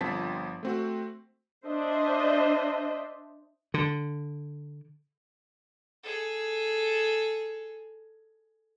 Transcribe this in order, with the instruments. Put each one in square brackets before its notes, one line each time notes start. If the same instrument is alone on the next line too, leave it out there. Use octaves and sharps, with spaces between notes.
[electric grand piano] G1 F3 C4 A5 B6
A3 C4 F#4
[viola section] D4 C5 D#5 E5
[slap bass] D3
[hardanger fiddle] G#4 A4